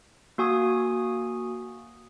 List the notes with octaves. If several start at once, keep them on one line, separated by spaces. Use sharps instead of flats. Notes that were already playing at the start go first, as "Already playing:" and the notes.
A#3 F#4 G#5 D#6